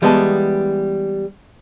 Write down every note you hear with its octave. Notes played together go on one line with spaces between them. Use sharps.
E3 G3 G#3 B3 D#5 A5